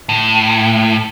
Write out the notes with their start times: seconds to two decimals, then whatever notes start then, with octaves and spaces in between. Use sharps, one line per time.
0.09 A2